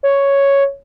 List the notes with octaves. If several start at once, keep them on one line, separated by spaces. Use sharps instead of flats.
C#5